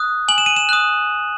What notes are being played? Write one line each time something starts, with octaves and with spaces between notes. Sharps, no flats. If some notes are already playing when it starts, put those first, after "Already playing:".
Already playing: D#6 F#6
G#5 F#7
E7
D#7
E7
D#6 F#6